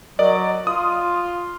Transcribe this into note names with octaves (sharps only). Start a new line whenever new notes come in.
F#3 A#4 D5 D#5
F4 D#6